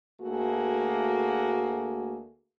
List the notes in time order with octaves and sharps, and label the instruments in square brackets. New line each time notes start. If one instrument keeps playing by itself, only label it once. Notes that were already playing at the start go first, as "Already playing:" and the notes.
[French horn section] D2 A3 A#3 F#4 G#4